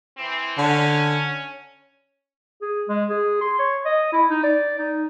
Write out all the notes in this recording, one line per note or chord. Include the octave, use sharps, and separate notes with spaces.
E3 C4
D3 C#4
G#4
G#3
G#4
C6
C#5
D#5
E4
D#4
D5
D#4